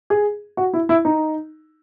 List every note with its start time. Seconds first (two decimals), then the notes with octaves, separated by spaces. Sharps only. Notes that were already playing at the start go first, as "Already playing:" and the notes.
0.10 G#4
0.57 F#4
0.73 E4
0.89 E4
1.05 D#4